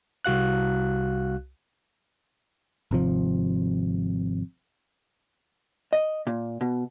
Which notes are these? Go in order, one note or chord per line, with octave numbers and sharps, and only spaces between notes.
C2 F#4 F5 F#6
G#1 C3 F3
D#5
A#2
B2